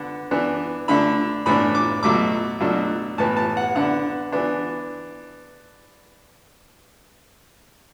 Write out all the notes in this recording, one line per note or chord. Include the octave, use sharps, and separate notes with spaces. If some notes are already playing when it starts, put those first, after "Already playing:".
Already playing: D3 B3 D4 F#5
E3 B3 D4
D3 A3 D4 B5
A2 E3 B3 D4 B5
D6
B2 F#3 A3 D6
B2 F#3 A3 D4
A2 E3 B3 A5
A5
F#5
D3 B3 D4 F#5
E3 B3 D4